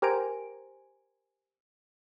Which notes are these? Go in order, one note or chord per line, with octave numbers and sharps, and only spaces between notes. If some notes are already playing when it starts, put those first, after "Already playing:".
G4 A#4 C5 G#5 A#5 D7